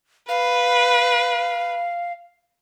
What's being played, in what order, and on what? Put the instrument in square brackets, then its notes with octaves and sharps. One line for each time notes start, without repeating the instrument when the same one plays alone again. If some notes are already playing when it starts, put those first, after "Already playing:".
[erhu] B4 [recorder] F5